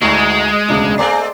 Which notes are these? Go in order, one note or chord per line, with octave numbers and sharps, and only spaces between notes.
D2 G2 G#3
E1 D2 C#3 D4
G#3 A3 C4 D5 D6